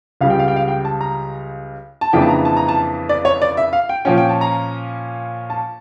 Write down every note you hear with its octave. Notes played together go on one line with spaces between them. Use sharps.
C#2 C#3 G3 F5
G5
F5
G5
F5
G5
A5
A#5
A5
F2 C#3 E3 A#3 D4 G5
A5
A#5
A5
A#5
A5
D5
C#5
D5
E5
F5
G5
A#2 F3 C#4 G5
G5
A5
A#5
A5